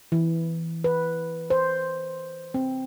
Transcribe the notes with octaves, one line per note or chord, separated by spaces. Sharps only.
E3
B4
C5
C4